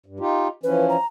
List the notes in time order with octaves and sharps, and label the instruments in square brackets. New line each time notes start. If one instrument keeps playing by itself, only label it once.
[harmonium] G2
D#4 F4 G4
[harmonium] E3 F3 C#4 [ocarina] B4
[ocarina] A#5